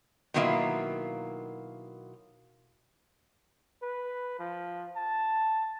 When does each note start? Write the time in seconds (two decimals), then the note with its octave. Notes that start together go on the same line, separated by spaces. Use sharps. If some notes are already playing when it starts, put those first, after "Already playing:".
0.34 B2 D#3 F#3 A#3 E4 F4
3.83 B4
4.39 F3
4.96 A5